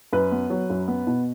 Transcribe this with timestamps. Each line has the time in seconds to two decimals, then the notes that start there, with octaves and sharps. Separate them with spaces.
0.13 F#2 B4
0.31 B3
0.50 F#3
0.70 F#2
0.88 B3
1.07 B2